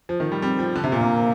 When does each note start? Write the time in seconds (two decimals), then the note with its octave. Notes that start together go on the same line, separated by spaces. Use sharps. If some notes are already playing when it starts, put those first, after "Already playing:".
0.09 F3
0.20 D#3
0.32 G3
0.42 G3 C4
0.59 F3
0.72 C4
0.76 D3 D4
0.84 C3
0.92 A#2 A#3
1.01 C3